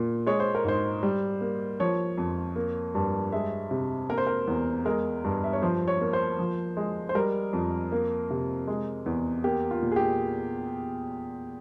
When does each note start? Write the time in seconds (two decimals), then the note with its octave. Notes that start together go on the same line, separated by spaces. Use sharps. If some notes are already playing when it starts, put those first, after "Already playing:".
Already playing: A#2 A#3
0.26 G#3 C#5
0.40 C5
0.55 A#4
0.65 G#2 C5
1.03 G3
1.41 A#3
1.80 F3 C#5
2.18 F2
2.56 A#3
2.95 G2
3.32 G#3 E5
3.71 C3
4.09 A#3 A#4
4.18 C5
4.27 A#4
4.47 E2
4.85 G#3 A#4
5.24 G2
5.44 E5
5.53 C#5
5.62 F3 C5
5.88 C#5
6.01 A#3
6.13 C5
6.39 F3
6.77 G#3
7.09 C5
7.15 G3 A#4
7.53 F2
7.92 A#3
8.30 C3
8.68 G#3
9.06 E2
9.44 A#3 G4
9.71 F4
9.82 A#2
9.91 G#4
9.96 G4